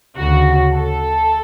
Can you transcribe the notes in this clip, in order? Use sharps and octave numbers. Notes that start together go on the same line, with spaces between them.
D2 C#3 F#4
A4